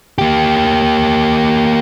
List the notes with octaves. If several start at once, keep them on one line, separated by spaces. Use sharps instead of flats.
A#3 G4